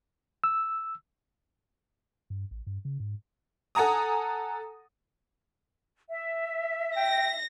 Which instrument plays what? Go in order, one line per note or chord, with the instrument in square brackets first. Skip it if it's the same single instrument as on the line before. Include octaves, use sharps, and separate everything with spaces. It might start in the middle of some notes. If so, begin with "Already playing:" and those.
[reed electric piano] E6
[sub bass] G2
A1
G2
C#3
G#2
[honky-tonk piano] A4 F#5 G#5 A#5 D#6
[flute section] E5
[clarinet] G5 [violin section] A#6